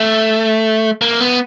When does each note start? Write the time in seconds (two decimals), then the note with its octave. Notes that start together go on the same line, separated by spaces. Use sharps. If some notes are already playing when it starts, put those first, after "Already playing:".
Already playing: A3
1.01 A#3
1.20 B3